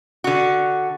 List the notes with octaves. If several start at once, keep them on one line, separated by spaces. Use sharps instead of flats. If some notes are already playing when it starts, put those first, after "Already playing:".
D3 F#4